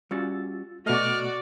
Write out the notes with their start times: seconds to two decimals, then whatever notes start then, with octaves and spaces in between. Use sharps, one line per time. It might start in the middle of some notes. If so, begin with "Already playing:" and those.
0.11 G3 C#4 F4 F#4 E6 A6
0.86 B2 A3 F#4 B4 D5 D#5 F6